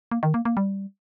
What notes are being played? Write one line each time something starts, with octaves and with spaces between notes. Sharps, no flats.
A#3
D#3
A#3
A#3
G3